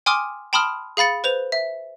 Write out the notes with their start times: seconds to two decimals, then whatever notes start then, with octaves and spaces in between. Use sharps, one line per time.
0.06 G5 G#5 C6 D6 D#6 F6
0.53 G5 A5 B5 C6 D#6 F6
0.97 G#4 F5 B5 A6 C#7
1.24 B4 C5 F7
1.52 E5